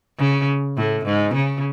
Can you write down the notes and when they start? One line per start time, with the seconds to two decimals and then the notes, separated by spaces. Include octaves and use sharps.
0.18 C#3
0.77 A2
1.05 G#2
1.34 C#3